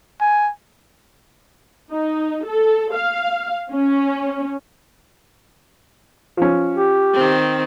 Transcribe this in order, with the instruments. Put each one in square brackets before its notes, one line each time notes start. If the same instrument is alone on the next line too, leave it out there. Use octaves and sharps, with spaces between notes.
[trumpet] G#5
[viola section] D#4
A4
F5
C#4
[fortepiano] F3 C#4
[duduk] G4
[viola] D#3 C4